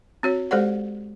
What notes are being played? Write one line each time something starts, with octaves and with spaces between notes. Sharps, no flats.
C4 F#4 C#5
G#3 G4 A4 C5 D5 F#5